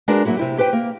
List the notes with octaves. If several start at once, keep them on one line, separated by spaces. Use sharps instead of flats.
G#3 D4 F#4 A#4 B4 D5
F#3 G#3 A#3 E4 F#4
C3 E4 G4
G4 B4 C5 G5
A#3